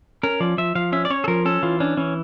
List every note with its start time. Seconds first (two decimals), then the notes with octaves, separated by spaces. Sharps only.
0.23 C#4 A#4
0.40 F3 D5
0.58 F3 E5
0.75 F3 F5
0.92 C#4 E5
1.05 D5
1.10 C#4 C#5
1.24 A4
1.28 F3 A#4
1.45 C#4 A4
1.63 E3 F4
1.80 C#4 D4
1.97 E3 C#4